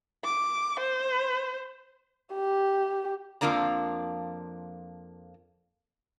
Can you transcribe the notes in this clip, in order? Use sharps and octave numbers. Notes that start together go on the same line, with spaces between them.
D6
C5
G4
F2 G#2 F3 A#3 D4 A#5